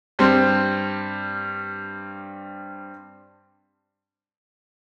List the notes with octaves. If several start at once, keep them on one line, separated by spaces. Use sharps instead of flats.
G2 G3 C4